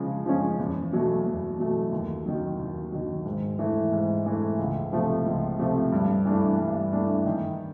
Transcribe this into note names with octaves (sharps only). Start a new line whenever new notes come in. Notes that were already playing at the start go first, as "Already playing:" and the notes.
Already playing: C#3 F3 G#3
F3 G#3 C#4
E2
B2 F#3 A3
E2
B2 F#3 A3
D#2
D#3 F#3
D#2
D#3 F#3
G#2
E3 A3
G#2
E3 A3
C#2
C3 F3 A3
C#2
C3 F3 A3
G2
E3 A3 D4
G2
E3 A3 D4
D#3